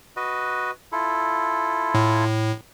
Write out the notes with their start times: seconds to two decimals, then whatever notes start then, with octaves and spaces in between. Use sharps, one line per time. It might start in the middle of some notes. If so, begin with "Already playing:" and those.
0.16 F#4 B4 D#5
0.92 E4 F4 A4
1.95 A2